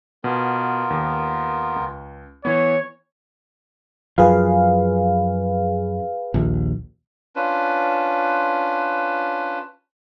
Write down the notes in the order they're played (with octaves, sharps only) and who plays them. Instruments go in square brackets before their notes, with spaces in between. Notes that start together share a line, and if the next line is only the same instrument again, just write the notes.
[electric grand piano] B2 [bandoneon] B3 F4 A#4
[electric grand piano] D#2
C#2
[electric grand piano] E3 B3 [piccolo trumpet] C#5
[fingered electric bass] F#2 F3 [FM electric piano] G#4 B4 F5
[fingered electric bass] A#1 D#2
[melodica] C#4 D4 F4 B4